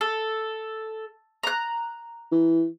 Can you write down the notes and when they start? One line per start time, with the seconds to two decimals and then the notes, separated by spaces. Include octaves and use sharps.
0.01 A4
1.43 A#5 F#6
2.32 E3